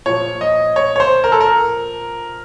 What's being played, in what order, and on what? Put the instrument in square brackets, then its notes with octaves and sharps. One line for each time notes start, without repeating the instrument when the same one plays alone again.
[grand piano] A#2 F3 C#5
D#5
C#5
C#5
C5
A#4
A4
A#4